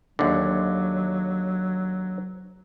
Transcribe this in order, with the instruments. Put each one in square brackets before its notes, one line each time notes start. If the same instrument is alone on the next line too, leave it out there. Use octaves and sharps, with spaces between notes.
[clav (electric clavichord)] D#2 D3 [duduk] F#3